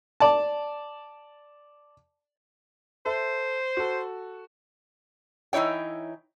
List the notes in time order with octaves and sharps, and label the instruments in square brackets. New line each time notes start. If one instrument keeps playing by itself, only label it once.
[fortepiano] D5 A5
[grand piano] A4 E5 [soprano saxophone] C5
[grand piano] F#4 A4
[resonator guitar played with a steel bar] E3 D#4 E4 C#5 G5